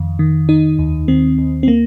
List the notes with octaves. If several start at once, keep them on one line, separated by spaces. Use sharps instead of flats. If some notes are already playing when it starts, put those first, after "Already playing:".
Already playing: F2 D#3
D#3
D#3 D#4
D#2
D#3 C4
D#2
C4
A#3